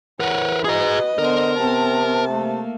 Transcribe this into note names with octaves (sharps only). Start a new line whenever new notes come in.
E3 A#4 B4 C#5 F#5
F#4 G#4 B4 D#5 A#5
D3 B3 A#4 C5
C3 B3 C4 A5
A3 A#3